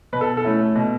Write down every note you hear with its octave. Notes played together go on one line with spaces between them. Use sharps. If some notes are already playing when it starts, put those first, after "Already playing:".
B2 B4
A4
A4
A3 C#4 E4
B2